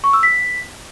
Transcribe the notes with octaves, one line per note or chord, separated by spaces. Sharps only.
C#6
E6
B6